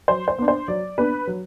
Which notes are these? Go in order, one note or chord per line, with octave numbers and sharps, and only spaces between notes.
F#3 C5
C5
B3 D4
C5
F#3 D5
B3 D4 B4
F#3